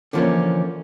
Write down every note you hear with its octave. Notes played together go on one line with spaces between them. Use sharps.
D3 E3 F3 G3 A#3 C#4